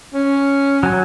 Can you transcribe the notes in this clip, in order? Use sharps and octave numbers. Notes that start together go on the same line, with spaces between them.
C#4
F#3 G#5